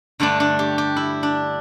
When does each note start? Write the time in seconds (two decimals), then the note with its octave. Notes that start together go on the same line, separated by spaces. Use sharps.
0.20 G2 D3 A3 D4
0.40 D4
0.59 G4
0.78 G4
0.96 E4
1.23 D4